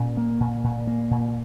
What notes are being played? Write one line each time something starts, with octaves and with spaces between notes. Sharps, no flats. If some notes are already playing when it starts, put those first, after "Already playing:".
Already playing: A#2 C#4
A#3
A#2
A#2
A#3
A#2